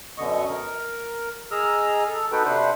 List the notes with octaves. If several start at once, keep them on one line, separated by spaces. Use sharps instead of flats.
F#2 B2 D3 D#5 C#6
A#4
G#4 D#5 A#5 E6 F6
A4
B3 D#4 F#4 A4 B4 G5
C3 D4 B4 C5 F#5